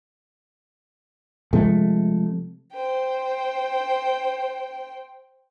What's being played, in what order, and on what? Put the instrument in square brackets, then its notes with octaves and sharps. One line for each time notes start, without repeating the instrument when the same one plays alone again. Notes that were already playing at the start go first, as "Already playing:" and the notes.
[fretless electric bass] C3 F3 G#3 A3
[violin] C5 G5